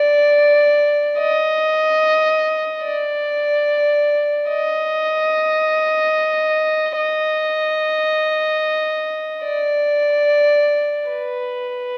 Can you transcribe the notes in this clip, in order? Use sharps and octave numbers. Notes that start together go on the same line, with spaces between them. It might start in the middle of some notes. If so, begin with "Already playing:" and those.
Already playing: D5
D#5
D5
D#5
D#5
D5
B4